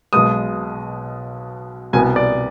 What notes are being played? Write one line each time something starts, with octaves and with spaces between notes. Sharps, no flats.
B1 B2 G#3 B3 D#6
C2 B2 B3 G#5
D5